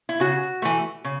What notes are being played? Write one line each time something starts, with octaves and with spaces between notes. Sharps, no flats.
E4
C#3 F#4
E3 A3
C#3